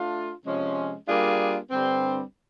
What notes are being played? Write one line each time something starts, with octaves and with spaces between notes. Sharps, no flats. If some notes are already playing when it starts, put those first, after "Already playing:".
Already playing: A3 D4 F4
C3 F3 G#3 C#4
G3 A#3 D4 F4 G#4
G2 D3 G3 C4